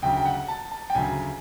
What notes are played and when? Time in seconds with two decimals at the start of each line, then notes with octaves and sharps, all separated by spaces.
0.02 D2 C#3 F#3 G5
0.17 G5
0.25 F#5
0.48 A5
0.72 A5
0.90 G5
0.95 D2 C#3 F#3 G#5